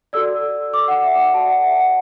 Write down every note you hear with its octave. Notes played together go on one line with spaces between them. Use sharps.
F#4 A4 D5 E6
D6
F#5
E5
F#5
F#4 D5 A5
F#5
E5
F#5